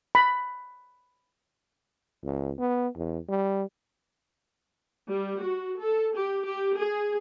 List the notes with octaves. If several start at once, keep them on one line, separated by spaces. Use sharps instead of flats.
B5
C#2
B3
E2
G3
G3
F#4
A4
G4
G4
G#4